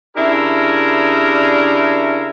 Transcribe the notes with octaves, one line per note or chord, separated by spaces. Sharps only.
C#3 D4 E4 G4 G#4 A#4